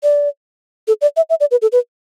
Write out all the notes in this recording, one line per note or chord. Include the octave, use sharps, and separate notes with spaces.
D5
A4
D5
E5
E5
D5
B4
A4
B4